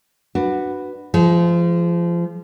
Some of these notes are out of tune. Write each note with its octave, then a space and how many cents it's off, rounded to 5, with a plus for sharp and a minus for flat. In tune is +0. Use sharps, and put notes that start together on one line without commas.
D4 +15 F#4 +0 B4 +0
F3 -25 G#3 +20